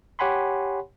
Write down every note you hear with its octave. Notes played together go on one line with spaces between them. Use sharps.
G4 C#5 F#5 G#5 B5 C6